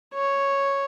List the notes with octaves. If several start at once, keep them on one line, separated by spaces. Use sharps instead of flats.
C#5